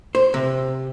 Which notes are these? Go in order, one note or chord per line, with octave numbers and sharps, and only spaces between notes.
C5
C3